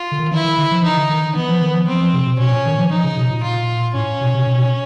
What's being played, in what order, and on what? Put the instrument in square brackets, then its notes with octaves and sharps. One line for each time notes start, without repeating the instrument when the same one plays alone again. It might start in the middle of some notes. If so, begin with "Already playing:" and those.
Already playing: [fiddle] F4
[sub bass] D3
D#3
[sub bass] E3 [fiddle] E4
[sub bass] D#3
D3
F3
[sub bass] E3 [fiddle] D#4
[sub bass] D3
D#3
[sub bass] E3 [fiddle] B3
[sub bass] F3
D#3
F3
[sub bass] F3 [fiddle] C4
[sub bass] F3
C3
B2
[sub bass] B2 [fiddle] C#4
[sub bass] A#2
D#3
F3
[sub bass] F3 [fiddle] D#4
[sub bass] C#3
B2
A#2
[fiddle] F4
[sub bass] A2 [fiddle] C#4
[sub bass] B2
C3
B2